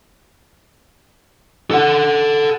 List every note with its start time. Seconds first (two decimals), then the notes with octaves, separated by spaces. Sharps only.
1.71 A4 F#5